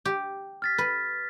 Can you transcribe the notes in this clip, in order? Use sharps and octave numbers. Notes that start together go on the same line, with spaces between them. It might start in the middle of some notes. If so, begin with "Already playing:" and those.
G4
F6 A6 B6
B4